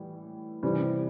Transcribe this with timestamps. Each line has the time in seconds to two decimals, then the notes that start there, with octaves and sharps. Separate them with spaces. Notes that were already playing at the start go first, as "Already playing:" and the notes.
Already playing: A2 E3 G3
0.63 C3 E3 G3